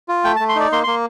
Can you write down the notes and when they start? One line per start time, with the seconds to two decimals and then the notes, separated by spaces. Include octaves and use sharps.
0.09 F4
0.24 A3 G5
0.36 A5
0.40 A3
0.49 C6
0.56 D#4 D5
0.72 A#3 C6
0.83 A#3 C6